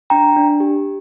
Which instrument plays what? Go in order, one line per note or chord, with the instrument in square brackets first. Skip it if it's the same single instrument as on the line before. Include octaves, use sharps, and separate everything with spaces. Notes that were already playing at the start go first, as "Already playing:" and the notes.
[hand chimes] D4 G5 A#5
D4
G4